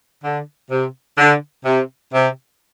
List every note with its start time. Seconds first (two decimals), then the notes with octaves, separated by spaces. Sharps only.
0.24 D3
0.70 C3
1.18 D3
1.65 C3
2.13 C3